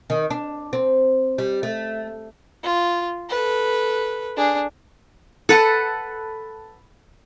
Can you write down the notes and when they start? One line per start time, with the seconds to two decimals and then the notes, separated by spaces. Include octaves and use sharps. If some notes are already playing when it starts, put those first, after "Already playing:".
0.10 D#3
0.30 D4
0.73 C4
1.38 G3
1.63 A3
2.63 F4
3.29 A4 B4
4.37 D4 G#4
5.49 A4 B4 F#5